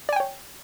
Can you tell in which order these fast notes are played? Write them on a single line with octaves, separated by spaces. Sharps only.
D5 G#5 G5 C#5